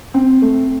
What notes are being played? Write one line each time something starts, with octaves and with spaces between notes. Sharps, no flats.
C4
A3